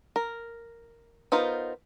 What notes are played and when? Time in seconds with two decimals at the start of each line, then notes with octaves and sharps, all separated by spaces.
0.16 A#4
1.32 B3 D#4 F4 A#4 C5